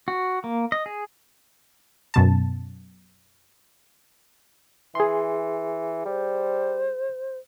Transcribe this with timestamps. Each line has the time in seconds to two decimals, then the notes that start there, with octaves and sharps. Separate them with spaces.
0.08 F#4
0.44 A#3
0.72 D#5
0.86 G#4
2.14 F#2 B2 A5
4.95 E3 G#4 C6
6.05 G3 C5